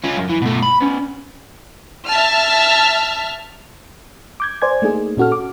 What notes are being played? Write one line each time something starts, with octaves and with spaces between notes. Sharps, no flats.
C#4 F4
F#2
E3
B2 A3
B5
B3 C#4
E5 A5 F6
D6 G6 G#6
C5 D5 G#5 G#6
A3 A#3 D#4 G#4
A#2 C#4 F#4 A4 F6
D6